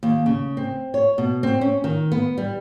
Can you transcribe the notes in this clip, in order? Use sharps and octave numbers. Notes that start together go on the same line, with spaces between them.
D#2
C#3
C4
C#5
B2
C4
C#4
D#3
B3
G3